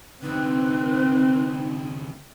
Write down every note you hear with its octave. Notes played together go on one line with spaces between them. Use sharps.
C2 D3 C4 D#4 B4